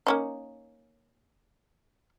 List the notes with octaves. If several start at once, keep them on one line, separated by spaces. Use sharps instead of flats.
A#3 C#4 D#4